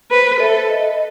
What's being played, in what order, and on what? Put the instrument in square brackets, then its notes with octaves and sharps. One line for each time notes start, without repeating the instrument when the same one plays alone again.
[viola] B4 [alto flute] C5
[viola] A4 [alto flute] E5
[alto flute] D#5